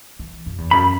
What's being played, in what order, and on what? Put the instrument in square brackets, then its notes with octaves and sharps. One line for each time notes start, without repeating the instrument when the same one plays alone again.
[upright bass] E3
F#2
E2
[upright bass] F#2 [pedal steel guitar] B5